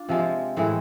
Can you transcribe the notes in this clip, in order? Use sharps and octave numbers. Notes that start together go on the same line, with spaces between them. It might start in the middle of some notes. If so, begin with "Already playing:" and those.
Already playing: D4 F4
C3 F3 G#3 C4
A2 E3 G#3 C4